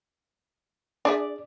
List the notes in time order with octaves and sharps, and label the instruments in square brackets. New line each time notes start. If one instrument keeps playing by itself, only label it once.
[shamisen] D4 G#4 E5 [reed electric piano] D5